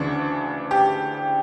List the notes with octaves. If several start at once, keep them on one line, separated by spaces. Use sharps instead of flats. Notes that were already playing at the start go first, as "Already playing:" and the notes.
Already playing: D2 C#3 E3 D4
G4